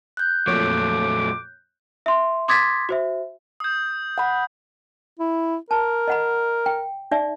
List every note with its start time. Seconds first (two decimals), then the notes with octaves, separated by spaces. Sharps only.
0.17 F#6 G6
0.48 F2 A#2 F#3 A3 C#5 D6
2.06 E5 C6
2.48 C6 D6 D#6 G#6 A6 B6
2.89 F#4 C5 E5
3.60 D#6 G6
4.18 F#5 B5
5.20 E4
5.71 A#4 A5
6.08 D#5 F#5 B5
6.66 G5
7.11 D#4 D5 E5